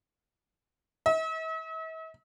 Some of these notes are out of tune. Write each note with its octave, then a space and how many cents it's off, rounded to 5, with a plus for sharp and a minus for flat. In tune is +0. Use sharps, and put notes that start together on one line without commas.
E5 -45